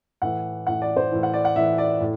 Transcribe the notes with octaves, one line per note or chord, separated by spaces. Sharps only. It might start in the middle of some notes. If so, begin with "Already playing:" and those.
A2 E3 F#5
A2 E3 F#5
D5
C5
A2 E3
F#5
D5
F#5
A2 E3 E5
D5
A2